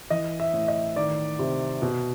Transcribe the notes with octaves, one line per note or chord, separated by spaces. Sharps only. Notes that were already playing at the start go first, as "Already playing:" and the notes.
E3 D#5
E5
A2
D#5
D#3 D5
C3
B2